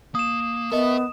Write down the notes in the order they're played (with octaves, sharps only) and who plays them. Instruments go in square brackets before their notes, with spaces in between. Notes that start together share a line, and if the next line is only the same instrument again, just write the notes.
[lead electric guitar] A#3 [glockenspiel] D#6 E7
[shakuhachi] B3 [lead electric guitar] A4 E5 [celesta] A#4 D#5